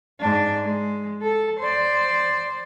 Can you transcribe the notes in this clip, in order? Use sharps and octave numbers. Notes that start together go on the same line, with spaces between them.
G#2 D4
G#3
A4
C5 D5